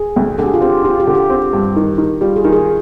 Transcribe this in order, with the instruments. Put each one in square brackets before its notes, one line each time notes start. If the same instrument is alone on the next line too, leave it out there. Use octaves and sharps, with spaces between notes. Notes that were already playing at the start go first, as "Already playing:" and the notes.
Already playing: [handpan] G#4
[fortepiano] D2
[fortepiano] D3 [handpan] G#4
[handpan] G4
F4
[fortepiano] C4 [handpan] G4
[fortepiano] F4 [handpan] G4
[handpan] G4
[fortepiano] D3
[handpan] G4
[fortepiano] C4
G2
D#3
D#3
[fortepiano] G3 [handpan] F4
[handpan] G#4
[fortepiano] D#3
[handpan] G#4